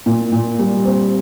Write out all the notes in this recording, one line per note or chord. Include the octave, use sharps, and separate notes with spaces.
A#2
A#2
G3
C4